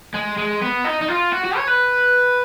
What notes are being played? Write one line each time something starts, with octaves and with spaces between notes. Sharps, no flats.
G#3
G#3
B3
D#4
D#4
F4
F#4
F#4
C#5
B4